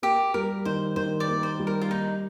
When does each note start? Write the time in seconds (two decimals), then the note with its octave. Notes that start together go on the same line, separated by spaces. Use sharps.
0.03 A#3 G4
0.34 G3 A#4
0.65 D#3 C5
0.96 D#3 C5
1.20 D5
1.28 A#3
1.43 C5
1.59 G3
1.67 A#4
1.82 F4
1.91 A#3 D#4